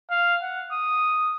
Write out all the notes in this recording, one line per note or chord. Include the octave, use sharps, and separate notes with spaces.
F5
F#5
D#6